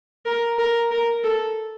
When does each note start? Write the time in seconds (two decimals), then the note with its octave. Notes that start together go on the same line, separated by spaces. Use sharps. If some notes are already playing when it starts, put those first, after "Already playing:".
0.26 A#4
0.58 A#4
0.91 A#4
1.24 A4